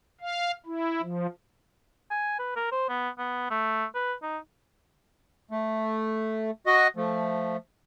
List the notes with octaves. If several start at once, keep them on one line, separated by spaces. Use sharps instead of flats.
F5
E4
F3
G#5
B4
A#4
C5
B3
B3
A3
B4
D#4
A3
F#4 D#5
F3 A3